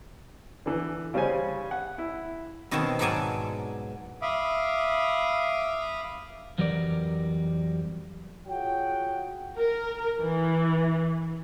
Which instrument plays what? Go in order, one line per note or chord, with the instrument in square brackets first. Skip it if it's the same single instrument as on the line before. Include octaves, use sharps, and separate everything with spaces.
[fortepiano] D3 E3
C#3 G3 C#4 C5 G#5
F#5
E4
[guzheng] B2 D#3 C4 C#5 A5
G#2 B2 F#3 D5 G#5 A5
[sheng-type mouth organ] E5 F5 B5 D6 D#6
[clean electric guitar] F2 E3 F#3 G3 A#4 D5
[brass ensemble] F4 F#4 G#4 C#5 F#5 G5
[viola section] A#4
E3